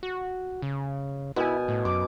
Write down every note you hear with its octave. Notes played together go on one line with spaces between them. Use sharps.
F#4
C#3
B2 E4 G#5
A2
F#2 D6